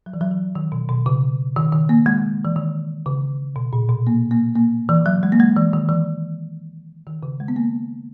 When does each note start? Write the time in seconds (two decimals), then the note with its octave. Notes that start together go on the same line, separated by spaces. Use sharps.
0.06 F#3
0.14 E3
0.21 F#3
0.31 E3
0.55 D#3
0.72 B2
0.89 B2
1.06 C#3
1.56 D#3
1.72 D#3
1.89 A#3
2.06 G#3
2.45 E3
2.56 D#3
3.06 C#3
3.56 B2
3.73 A#2
3.89 B2
4.07 A#3
4.31 A#3
4.56 A#3
4.89 E3
5.06 F#3
5.23 G#3
5.32 A#3
5.40 G#3
5.56 E3
5.73 D#3
5.89 E3
7.07 D#3
7.23 C#3
7.40 G#3
7.48 B3
7.56 A#3